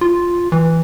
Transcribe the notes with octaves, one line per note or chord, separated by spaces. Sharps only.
F4
E3